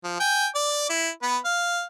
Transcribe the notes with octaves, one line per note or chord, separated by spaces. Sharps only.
F3
G5 G#5
D5 D6
E4
B3 B4
F5